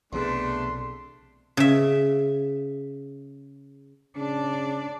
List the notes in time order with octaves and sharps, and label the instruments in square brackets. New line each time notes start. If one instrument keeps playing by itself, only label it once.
[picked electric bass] B1 C3 C4 [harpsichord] E2 [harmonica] A3 D4 [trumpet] C6
[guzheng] C#3 E5
[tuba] C#3 [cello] D4 D5